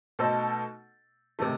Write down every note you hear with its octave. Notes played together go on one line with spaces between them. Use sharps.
B2 A3 D#4 A4 C5
C3 D#3 A3